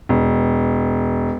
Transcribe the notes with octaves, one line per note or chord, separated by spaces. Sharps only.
E1